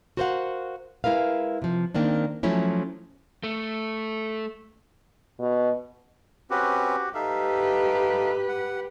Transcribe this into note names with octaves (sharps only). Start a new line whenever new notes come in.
F#4 A#4 C5 C#5 F5 F#5
G#3 E4 A#4 B4 F5
C3 F3
D#3 A#3 C4 D4
F3 F#3 A3 C#4 E4
A3
B2
C4 C#4 F#4 G4 B4
D#4 G4 A4 B4 E5 F5
F#5